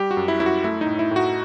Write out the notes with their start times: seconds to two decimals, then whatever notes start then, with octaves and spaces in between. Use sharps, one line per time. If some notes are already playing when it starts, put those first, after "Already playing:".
Already playing: G3 G4
0.11 F#4
0.17 F#2
0.28 E4
0.40 F#2 E4
0.46 F#4
0.64 A3 E4
0.81 D#4
0.87 A2
0.99 E4
1.11 A2 F#4